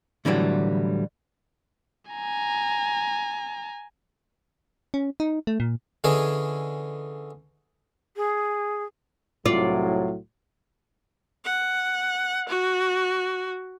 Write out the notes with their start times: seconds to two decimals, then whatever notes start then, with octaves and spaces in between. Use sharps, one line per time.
0.25 A2 D3 E3 F#3 G3
2.11 G#5 A#5
4.94 C#4
5.20 D#4
5.47 A3
5.60 A#2
6.04 D3 E3 C#4 G#4 D#5
8.17 G#4
9.46 C2 A2 F#3 F4 D5
11.45 F#5
12.49 F#4